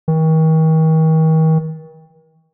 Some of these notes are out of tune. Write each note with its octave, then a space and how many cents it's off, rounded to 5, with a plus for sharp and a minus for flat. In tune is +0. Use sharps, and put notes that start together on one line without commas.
D#3 +40